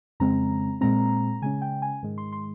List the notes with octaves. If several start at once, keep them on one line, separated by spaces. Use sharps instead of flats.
F2 C#3 G#3 C4 A#5
A#2 G#3 C4 A#5
C#3 G#3 C#4 G#5
G5
G#5
G#2 D#3 G#3
C6
C6